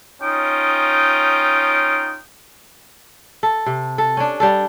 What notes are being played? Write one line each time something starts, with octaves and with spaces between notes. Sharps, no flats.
C#4 D#4 F4 G5 D#6
A4
C3
A4
C#4 D4
G3 D4 A4